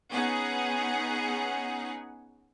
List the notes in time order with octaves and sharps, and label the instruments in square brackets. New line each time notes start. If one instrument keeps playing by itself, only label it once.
[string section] B3 C#4 D#4 G#4 F#5